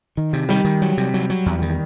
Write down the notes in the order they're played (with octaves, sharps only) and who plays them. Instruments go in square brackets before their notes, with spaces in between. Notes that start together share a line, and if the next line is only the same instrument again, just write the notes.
[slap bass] D#3
C3
[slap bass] D#3 [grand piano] G3
[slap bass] D#3
F#3
C3
F#3
F#3
E2
D#3